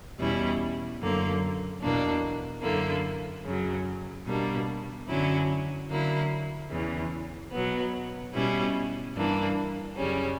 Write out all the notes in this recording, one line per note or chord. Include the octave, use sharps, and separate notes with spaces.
E2 B2 G3 C#4 E4
F#2 D3 A#3
E2 B2 A#3 D4
F#2 D3 A#3 E4
F#2 C#3 F#3
B2 G3 A#3 D4
F#2 D3 F#3 C#4 E4
D3 F#3 A#3 E4
E2 C#3 E3
B2 F#3 B3
B2 G3 C#4 E4
G2 E3 A#3 D4
F#2 C#3 G3 C#4